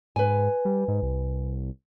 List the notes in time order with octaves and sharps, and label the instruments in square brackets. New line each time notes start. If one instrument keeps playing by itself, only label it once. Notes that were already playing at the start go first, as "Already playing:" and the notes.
[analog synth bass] G#2 [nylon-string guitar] B4 G#5
[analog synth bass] G3
G#2
C2